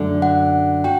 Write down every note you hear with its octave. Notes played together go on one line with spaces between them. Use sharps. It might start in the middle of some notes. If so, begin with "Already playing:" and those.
Already playing: F#2 D3 A3
F#5
F#4 G5